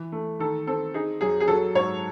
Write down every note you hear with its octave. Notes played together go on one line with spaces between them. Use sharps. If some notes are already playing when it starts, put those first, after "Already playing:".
Already playing: E3
A3
D#3 A4
C4 A4
D#4 G#4
F#2 G#4
G#4
F#3 A4
G#2 C#5